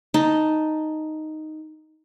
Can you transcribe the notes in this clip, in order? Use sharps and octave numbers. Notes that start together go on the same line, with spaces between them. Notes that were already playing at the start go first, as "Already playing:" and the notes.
D#4 A5